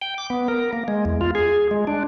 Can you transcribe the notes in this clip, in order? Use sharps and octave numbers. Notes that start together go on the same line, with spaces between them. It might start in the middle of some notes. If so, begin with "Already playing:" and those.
G5
D6
B3
A#4
A#3
G#3
E2
F4
G#4
G#3
D4